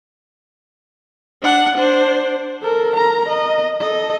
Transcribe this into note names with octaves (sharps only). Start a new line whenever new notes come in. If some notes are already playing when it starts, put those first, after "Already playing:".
D4 F#5
D4 C5
A4 A#4
A#4 A#5
D#5
A4 D#5